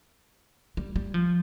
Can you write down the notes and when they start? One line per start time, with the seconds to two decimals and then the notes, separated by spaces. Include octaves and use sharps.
0.77 G3
0.96 G3
1.14 F3